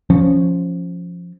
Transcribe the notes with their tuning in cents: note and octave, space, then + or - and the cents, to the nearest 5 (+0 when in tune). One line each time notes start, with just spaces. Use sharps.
F3 +5 C#4 +0